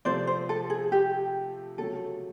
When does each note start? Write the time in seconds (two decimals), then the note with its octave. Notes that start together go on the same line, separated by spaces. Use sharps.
0.05 C3 F3 A3 C5 D5
0.27 C5
0.49 A4
0.70 G#4
0.92 G4
1.78 C#3 F#3 A3 A4